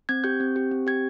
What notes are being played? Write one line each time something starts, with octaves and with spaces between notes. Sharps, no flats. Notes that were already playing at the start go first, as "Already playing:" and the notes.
C4 G#6
G4 G6
C4
G4
C4
G4 G#6